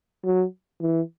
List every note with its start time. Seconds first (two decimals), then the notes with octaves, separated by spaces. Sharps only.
0.24 F#3
0.81 E3